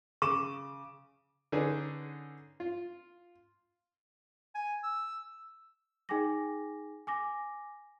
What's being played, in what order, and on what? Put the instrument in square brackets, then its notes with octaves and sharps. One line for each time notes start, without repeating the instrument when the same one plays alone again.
[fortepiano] C#3 [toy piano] C#6 [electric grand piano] D6 D#7 E7
[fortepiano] D3 C#4 D#4 G#4 B4
F4
[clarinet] G#5
E6
[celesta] D#4 G#4 G5 G#5 D6 A#6
G#5 D6 A#6